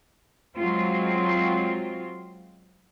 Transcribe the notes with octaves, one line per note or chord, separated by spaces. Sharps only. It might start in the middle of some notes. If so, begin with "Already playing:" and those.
F#3 G#3 C4 F4